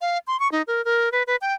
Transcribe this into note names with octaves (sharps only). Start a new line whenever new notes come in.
F5
C6
C#6
D#4
A#4
A#4
B4
B4
G5